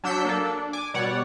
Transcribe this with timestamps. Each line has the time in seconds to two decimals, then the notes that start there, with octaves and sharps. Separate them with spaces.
0.04 F#3 D4 E6 G6 B6 C#7
0.25 A#3 D4 A4
0.46 D4
0.73 G#5 D6
0.94 B2 G3 C#5 D5 F#5